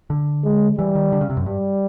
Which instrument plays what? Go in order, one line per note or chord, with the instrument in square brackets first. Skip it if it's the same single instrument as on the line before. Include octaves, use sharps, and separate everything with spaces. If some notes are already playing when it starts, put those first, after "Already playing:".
[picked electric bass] D3
[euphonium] G#3
[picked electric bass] E3 [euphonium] G3
[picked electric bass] D#3
D3
C#3
C3
F#2
[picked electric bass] G2 [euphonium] G3